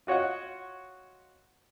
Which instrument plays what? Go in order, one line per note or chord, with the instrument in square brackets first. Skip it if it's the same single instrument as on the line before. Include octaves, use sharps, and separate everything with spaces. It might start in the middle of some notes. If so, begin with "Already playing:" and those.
[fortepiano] F4 F#4 C#5 D#5 F#5